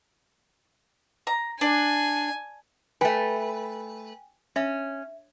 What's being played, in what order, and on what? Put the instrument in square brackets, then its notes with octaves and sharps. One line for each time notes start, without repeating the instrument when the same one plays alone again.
[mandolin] A#5
[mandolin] D4 [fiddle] G#5
[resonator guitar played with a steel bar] A3 B4 [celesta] G5 G#5
[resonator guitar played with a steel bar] C#4 [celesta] E5